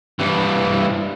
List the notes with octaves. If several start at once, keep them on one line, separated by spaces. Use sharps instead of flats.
G2 E3